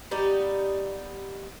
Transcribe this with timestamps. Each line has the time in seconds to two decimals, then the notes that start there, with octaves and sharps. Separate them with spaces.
0.11 G3 B3 D#4 G4